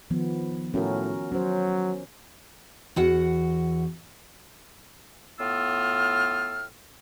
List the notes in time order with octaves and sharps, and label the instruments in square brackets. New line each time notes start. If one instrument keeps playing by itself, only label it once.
[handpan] D#3 F3 B3
[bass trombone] A2 [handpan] C#4 F#4 A#4
[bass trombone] F#3 [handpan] C#4 C5
[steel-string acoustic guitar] E2 F#4 F#5
[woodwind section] A2 B3 F4 E6 F6